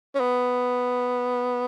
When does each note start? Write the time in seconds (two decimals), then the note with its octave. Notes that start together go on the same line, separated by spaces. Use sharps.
0.15 C#4
0.20 B3